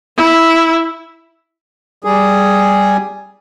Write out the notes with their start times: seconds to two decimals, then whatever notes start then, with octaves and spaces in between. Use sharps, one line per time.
0.16 E4
2.04 G3 G#4